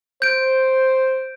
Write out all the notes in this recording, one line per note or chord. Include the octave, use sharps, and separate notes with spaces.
C5 G6 D7